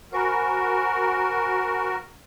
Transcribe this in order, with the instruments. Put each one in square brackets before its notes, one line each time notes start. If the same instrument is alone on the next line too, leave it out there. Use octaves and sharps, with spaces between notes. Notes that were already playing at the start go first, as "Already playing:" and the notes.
[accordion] F#4 A#4 [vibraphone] C5 G#5 B5